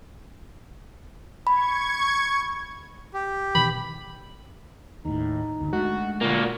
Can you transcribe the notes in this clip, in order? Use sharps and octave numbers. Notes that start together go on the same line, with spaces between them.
B5 C#6 G#6
G4
B2 D#3 E3 B5
D#2 A2 D#4
G1 D2
G#3 A3 D4 F#4
A#2 D3 A#3 F#4